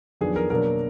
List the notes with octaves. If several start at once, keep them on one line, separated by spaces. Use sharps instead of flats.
F2 D#3 F#3 B3 D4 G#4
A#4
B2 F#3 A#3 D4 A#4